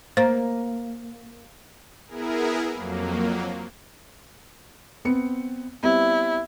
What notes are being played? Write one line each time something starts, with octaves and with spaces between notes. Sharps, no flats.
A#3 C5
B3 E4 G#4 A#4
F2 F#3 A#3
B3 C4 C#7
G3 B3 C4 E4